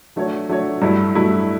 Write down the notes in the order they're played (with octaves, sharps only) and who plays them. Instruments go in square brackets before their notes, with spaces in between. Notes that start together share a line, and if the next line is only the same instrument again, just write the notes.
[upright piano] F#3 A3 D4 F#4 C#5
F#3 A3 D4 F#4 C#5
G2 F#3 A3 E4
G2 F#3 A3 E4